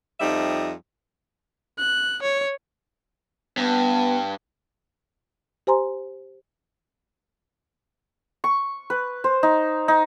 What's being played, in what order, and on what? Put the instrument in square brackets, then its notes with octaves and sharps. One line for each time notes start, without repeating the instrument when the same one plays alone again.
[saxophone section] F2 F3 G3 D#4 E5
[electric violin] F#6
C#5
[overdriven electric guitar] G2 [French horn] B3
[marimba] G4 C5 G#5 A#5 C6
[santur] C#6
B4
C5
D#4
D#4